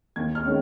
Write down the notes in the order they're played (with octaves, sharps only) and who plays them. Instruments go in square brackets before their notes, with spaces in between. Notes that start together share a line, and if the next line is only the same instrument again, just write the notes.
[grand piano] D#2 G#6
F6
D#3 G#3 C#4